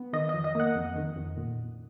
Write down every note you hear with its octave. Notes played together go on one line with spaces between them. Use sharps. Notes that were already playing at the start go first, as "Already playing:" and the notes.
Already playing: B3
D#3 D#5
F2 D#5
D#5
A#3 F#5
F2
D#3
F2
A#2